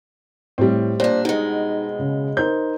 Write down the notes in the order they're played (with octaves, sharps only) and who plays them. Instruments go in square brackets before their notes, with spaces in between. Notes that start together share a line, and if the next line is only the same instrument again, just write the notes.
[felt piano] A2 [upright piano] G3 C4
[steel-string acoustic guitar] A#2 D4 [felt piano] C5 D5
[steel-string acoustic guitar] B2 G#3 [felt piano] D#4
[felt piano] C#3
[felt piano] D#4 A#4 C5 [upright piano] G6